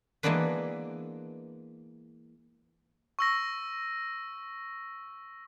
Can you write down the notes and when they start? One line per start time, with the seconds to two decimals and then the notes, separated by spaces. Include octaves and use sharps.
0.23 E3 G#3 A#3 B3 D4 B4
3.19 C#6 E6 A#6